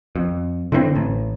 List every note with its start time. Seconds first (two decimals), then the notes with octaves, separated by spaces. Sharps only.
0.16 F2
0.72 D3 E3 B3 C4
0.95 A1